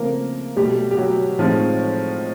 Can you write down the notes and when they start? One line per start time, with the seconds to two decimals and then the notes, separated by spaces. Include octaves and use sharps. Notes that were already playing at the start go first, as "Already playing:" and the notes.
Already playing: C#3 F3 A3 A#3 C4 A#4
0.56 B2 F#3 G3 A3 G4
0.91 G4
0.97 F#3 F#4
1.39 A2 F3 G#3 C4 D#4 F4